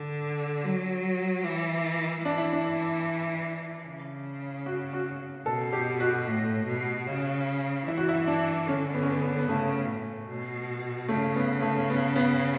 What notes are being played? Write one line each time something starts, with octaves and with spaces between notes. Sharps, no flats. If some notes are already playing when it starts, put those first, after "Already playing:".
Already playing: D3
F#3
E3
E3 D4
E4
D4
C#3
F#4
F#4
B2 A4
G4
F#4
A2
B2
C#3
E3 E4
F#4
E4
D4
D3 C#4
B3
C#4
B3
B3
B3
C#3 A3
A2
B2
C#3 A3
B3
A3
B3
B3